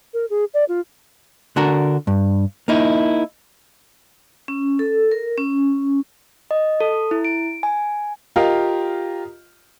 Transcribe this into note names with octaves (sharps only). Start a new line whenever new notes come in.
A#4
G#4
D5
F4
D3 D4 F#4 A#4
G2
A#3 D#4 E4
C#4
A4
A#4
C#4
D#5
A4
E4
D7
G#5
F4 G4 A#4 D#5 F5